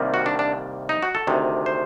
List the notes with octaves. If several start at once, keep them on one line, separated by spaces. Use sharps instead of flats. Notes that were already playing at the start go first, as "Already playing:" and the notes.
Already playing: C2 C3 D#3 G3 A#3
F#4
D4
D4
D#4
F#4
A4
D2 C3 D#3
C5